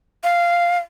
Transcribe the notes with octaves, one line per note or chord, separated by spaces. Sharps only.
F5